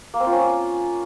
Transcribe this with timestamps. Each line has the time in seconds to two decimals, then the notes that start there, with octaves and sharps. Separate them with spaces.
0.14 A#3
0.20 C4
0.26 F4
0.33 C#4